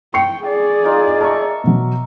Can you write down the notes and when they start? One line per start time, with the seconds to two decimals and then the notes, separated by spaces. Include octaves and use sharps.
0.14 G5 C#6 C7 C#7
0.45 G#4 D5
0.83 A#3 D#4 F4
1.21 A#4 E5 A5 C#6
1.64 B2 F#3